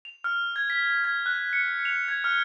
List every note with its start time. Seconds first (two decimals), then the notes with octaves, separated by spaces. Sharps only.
0.05 F7
0.24 F6
0.56 G#6
0.70 B6
1.04 G#6
1.26 F#6
1.53 C#7
1.85 F7
2.08 G#6
2.24 F6